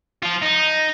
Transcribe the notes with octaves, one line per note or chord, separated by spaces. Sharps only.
F3 F4
D#4